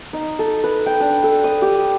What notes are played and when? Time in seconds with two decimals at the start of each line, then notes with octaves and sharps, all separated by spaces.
0.13 D#4
0.39 A4
0.64 B4
0.86 G5
1.00 D4
1.24 A4
1.44 D#6
1.62 G4